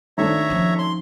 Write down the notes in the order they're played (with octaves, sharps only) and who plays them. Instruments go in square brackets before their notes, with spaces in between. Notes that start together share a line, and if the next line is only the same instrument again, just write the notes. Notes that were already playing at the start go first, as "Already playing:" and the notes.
[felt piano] G#1 A3 D4 [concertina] C#5 E5 A#5
[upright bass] F3 C#4
[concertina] C6